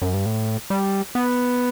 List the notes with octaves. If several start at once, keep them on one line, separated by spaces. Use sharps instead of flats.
F#2
G2
A2
G3
B3